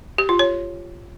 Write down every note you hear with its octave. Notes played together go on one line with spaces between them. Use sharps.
G4
F4
C#5